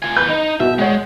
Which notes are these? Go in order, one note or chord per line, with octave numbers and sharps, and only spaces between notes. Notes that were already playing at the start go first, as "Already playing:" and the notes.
F4 G#5
E2 B4 G6
D#4
B2 E5
G#3 C#5 F#5